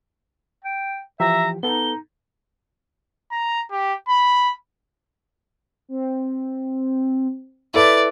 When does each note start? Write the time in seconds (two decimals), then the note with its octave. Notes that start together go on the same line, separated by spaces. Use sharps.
0.65 G5
1.20 E3 F3 G4 E5 A#5
1.63 B3 D#4 A4 G7
3.32 A#5
3.71 G4
4.08 B5
5.88 C4
7.74 E4 A4 B4 D5